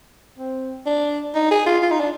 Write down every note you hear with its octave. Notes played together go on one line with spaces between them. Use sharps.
C4
D4
D#4
G#4
F4
F4
D#4
D4